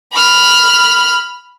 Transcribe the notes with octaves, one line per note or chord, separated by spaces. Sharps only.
B5 F6